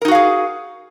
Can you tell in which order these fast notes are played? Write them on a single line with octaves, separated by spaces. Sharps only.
A#4 D#4 F#4 F5 G#4